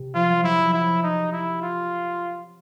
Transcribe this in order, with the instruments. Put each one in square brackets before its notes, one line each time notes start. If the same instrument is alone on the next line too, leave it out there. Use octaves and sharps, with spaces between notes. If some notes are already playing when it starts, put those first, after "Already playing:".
Already playing: [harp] C3
[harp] F3 [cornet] F4
[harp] F#3
[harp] F#3 [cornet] E4
[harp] F3
[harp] F#3 [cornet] E4
[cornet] D#4
E4
F4